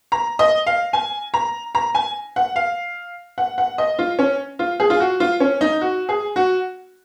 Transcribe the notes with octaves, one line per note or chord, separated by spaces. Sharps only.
A#5
D#5
F5
G#5
A#5
A#5
G#5
F#5
F5
F#5
F#5
D#5
F4
C#4
F4
G#4
F4
F#4
F4
C#4
D#4
F#4
G#4
F#4